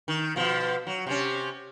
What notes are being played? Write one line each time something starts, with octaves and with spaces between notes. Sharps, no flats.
D#3
B2 F3
F#3
C3 C#4